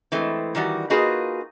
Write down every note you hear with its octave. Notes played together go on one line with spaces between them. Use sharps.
E3 G#3 A3 C4
D#3 E3 G3 F#4
A#3 D#4 F4 F#4 G#4 B4